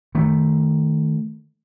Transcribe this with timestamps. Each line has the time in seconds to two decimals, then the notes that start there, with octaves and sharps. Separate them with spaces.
0.15 D#3 A3